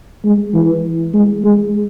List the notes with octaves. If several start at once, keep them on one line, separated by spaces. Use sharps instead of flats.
G#3
E3
G#3
G#3